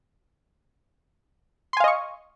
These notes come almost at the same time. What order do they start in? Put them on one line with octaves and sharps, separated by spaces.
C6 G#5 F5 D#5 C#6